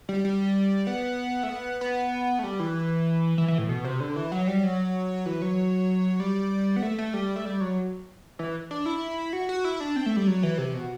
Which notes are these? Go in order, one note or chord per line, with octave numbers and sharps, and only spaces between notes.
G3
G3
B3
A3
B3
B3
A3
G3
E3
E3
E3
A2
B2
C3
D3
E3
F#3
G3
F#3
E3
F#3
G3
B3
A3
A3
G3
A3
G3
F#3
E3
D4
E4
F#4
F#4
E4
D4
C4
A3
G3
F#3
E3
C3
B2